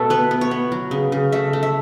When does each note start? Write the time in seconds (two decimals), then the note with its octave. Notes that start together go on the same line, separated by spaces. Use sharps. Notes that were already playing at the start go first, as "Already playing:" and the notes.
Already playing: B2 A3 A4
0.10 B3 B4
0.31 B3
0.41 C#5
0.51 B3
0.72 F#3
0.91 C#3
1.12 C#3
1.32 A3 E5
1.53 A3
1.63 E5